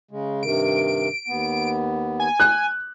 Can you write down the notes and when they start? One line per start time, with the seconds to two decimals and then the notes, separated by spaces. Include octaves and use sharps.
0.11 C#3 G#3
0.43 G2 C3 D#3 D7
1.28 D#2 B3
2.20 G#5
2.40 F#6